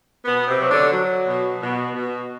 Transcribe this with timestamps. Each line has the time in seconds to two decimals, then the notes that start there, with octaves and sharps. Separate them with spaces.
0.25 B2 B3
0.48 C3 C4
0.59 F#3
0.70 D3 D4
0.93 F#3
1.27 B2
1.60 B2
1.94 B2